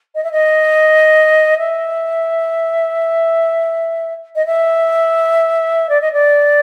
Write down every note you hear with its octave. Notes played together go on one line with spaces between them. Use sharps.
D#5
E5
D#5
E5
D#5
E5
D5
D#5
D5